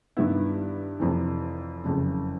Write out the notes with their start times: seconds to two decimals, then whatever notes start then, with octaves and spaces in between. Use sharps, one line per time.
0.17 G2 D#3 G3 B3 E4
1.00 F1 F2 C3 E3
1.84 F#1 F2 C#3